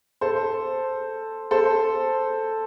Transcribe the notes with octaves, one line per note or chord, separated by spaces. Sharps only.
A4 C5
A4 C5